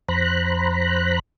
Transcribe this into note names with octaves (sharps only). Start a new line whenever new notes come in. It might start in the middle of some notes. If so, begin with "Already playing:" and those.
F2 C5 A#5 B5 F#6